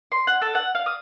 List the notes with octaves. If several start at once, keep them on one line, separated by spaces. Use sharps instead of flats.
C6
F#5
A4
F#5
F5
D#6